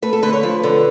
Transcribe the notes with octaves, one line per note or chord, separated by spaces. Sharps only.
A3 B4
A4
D3 B4
C#5
F3 B4
D3